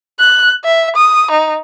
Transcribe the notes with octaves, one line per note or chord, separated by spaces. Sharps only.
F#6
E5
D#6
D#4